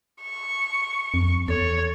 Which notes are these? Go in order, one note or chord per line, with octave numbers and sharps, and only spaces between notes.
C#6
F2
E2 A4 C#5